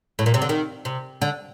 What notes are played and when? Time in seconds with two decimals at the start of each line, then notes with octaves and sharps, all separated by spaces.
0.19 A2
0.26 A#2
0.34 C3
0.42 D3
0.49 D#3
0.85 C3
1.22 D3